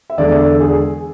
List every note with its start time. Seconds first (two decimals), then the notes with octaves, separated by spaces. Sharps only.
0.10 E5
0.18 E2 D3 G#3 D5
0.39 A4
0.60 G#4